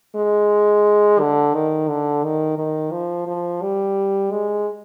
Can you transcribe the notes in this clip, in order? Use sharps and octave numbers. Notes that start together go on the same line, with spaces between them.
G#3
D3
D#3
D3
D#3
D#3
F3
F3
G3
G#3